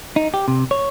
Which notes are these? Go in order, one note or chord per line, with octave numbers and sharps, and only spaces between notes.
D#4
G4
C3
C#5